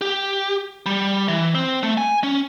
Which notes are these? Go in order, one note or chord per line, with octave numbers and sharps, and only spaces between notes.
G4
G3
E3
C4
A3
G#5
C#4